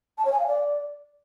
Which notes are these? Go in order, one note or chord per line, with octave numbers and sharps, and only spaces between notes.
A5
C#5
G#5
F5
D5